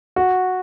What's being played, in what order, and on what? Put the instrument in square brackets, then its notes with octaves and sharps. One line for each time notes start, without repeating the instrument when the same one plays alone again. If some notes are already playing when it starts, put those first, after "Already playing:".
[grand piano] F#4